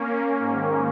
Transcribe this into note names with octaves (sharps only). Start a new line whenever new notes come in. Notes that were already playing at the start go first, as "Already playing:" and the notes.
Already playing: A#3 C#4
G#2 D#3